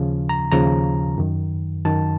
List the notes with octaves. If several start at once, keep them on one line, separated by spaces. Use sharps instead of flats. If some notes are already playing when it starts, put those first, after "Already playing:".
Already playing: D#2 C#3 F3
A#5
D#2 C#3 F3 A#5
F#2 D#3
F#2 D#3 A5